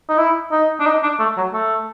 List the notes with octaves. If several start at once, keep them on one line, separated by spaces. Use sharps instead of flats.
D#4
E4
D#4
D4
D#4
D4
A3
F#3
A3